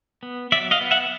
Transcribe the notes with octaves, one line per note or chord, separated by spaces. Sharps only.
B3
F#3 D5 E5
D#5 F5
B3
E5 F#5